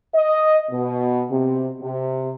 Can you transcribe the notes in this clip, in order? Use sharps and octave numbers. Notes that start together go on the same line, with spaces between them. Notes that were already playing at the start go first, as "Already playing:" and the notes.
D#5
B2
C3
C3